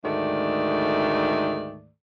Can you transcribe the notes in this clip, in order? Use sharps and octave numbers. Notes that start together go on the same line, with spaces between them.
D2 G#2 D#3 A3 D5